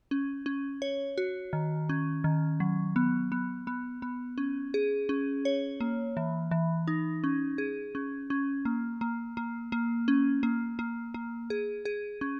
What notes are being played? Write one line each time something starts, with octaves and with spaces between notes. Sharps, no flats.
C#4
C#4
C#5
F#4
D#3
C#4
D#3
F#3
B3
B3
B3
B3
C#4
G#4
C#4
C#5
A#3
E3
E3
D#4
C#4
G#4
C#4
C#4
A#3
A#3
A#3
A#3
C#4
A#3
A#3
A#3
G#4
G#4
C#4